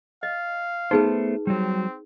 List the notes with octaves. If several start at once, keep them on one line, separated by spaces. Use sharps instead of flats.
D#5 F5
A3 B3 D#4 G#4 B4 C5
F#3 G3 C4